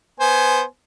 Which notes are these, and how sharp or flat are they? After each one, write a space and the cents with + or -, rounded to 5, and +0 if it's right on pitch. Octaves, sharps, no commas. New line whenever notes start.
B3 +0 C5 +0 G#5 +15